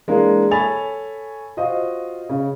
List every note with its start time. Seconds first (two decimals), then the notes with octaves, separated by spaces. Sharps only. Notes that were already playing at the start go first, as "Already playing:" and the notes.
0.08 E3 G#3 A#3 D4
0.51 A4 C#5 G#5 B5 A6 F7
1.57 F4 F#4 C5 D#5
2.30 C#3